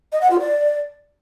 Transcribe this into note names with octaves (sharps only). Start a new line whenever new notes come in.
D#5
F#5
F4
D5